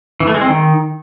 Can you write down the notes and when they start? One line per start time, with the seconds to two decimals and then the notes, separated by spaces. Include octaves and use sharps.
0.20 E3
0.27 A3
0.34 G#3
0.41 C4
0.48 D#3